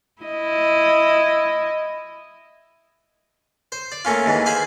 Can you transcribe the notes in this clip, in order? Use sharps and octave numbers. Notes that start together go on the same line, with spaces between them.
E4 D#5
C5
D5
A3 A#3 C#4 F4
D#2 G#2 E3
G#4 C5 F5 G#5 B5